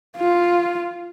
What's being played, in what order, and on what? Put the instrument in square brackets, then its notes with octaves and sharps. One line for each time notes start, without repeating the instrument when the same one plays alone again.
[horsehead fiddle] F4